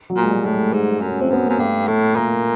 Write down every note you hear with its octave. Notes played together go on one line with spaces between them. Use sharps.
F#3
A#2
G#3
G3
A2 A3
G#3
G#2
F#2
C#4
F2 C4
F#2 B3
F#2 A#3
G2 A3
A2 A3
A#2 A#3